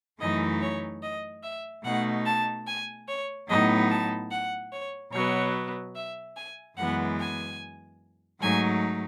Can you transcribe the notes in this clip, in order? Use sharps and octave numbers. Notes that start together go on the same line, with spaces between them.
F#2 E3 A3 D#4 D#5
C#5
D#5
E5
B2 A3 D#4 F#5
A5
G#5
C#5
A2 F#3 B3 D#4 D#5
A5
F#5
C#5
B2 F#3 B3 C#5
E5
G#5
F#2 E3 G#3 B3 F#5
G#5
G#2 F#3 A3 D#4 G#5